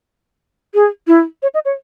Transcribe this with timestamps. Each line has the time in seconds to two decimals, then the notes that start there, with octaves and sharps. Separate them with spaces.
0.74 G#4
1.07 E4
1.42 C#5
1.54 D#5
1.65 C#5